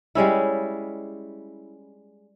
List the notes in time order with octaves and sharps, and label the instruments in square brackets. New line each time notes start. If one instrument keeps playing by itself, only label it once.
[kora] G3 G#3 C#4 E4